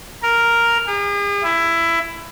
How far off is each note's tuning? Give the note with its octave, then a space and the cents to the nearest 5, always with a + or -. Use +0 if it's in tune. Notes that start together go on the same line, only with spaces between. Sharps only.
A#4 +0
G#4 -45
E4 +15